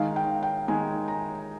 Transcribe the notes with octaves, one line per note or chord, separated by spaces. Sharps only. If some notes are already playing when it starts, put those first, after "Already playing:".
Already playing: D#3 G#3 D#4 F5
G5
G5
D#3 G#3 D#4 G#5
A#5